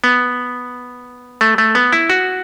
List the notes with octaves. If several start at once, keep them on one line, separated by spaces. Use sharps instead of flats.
B3
A3
A3
B3
E4
F#4